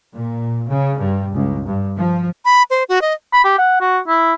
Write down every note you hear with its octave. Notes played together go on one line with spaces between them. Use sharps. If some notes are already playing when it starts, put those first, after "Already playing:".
A#2
C#3
G2
C#2
G2
F3
B5
C5
F#4
D#5
B5
G4
F#5
F#4
E4